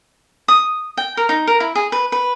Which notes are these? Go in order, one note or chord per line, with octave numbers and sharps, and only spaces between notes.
D#6
G5
A#4
D#4
A#4
E4
G#4
B4
B4